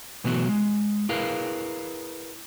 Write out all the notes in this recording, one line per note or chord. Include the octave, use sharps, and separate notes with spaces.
B2 E3 F#3 A3 B3 F#4
G#3
E4 G#4 A#4 B4 F5